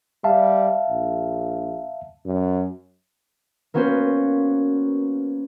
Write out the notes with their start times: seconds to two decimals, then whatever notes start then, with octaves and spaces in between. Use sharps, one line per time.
0.24 G3 E5 F5 A5
0.89 A#1
2.26 F#2
3.74 A#3 B3 C#4 F#4 B4 C5